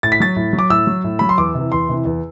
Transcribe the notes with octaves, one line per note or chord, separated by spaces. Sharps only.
A2 A6
B6
F#3 A6
A2
F#3
D6
A2 E6
F#3
A2
F#3 B5
C6
E2 D6
C3 E3
E2 C6
C3 E3
E2